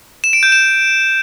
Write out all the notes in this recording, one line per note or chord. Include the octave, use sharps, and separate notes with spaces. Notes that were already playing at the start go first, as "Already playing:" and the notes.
E7
D7
G6
E7